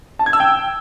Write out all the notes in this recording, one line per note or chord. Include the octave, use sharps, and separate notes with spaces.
A5
G#6
E6
G5